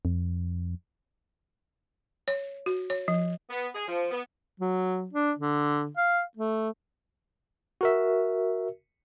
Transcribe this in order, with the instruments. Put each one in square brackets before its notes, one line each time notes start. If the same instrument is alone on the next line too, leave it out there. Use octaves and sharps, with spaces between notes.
[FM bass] F2
[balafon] C#5
F#4
C#5
F3
[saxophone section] B3
G#4
F3
B3
[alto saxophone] F#3
D4
D3
F5
A3
[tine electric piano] F#4 A#4 E5